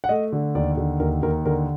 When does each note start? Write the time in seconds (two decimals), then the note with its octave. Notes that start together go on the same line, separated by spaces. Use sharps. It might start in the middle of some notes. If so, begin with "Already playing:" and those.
0.04 F#5
0.09 A3 D#5
0.32 D3
0.55 D#2 D5
0.77 D3
1.00 D#2 A#4
1.23 D#2 A#4
1.45 D3 A#4